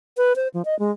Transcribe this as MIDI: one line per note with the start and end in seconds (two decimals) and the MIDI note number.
0.17 0.36 71
0.36 0.48 72
0.54 0.62 53
0.65 0.77 75
0.79 0.91 56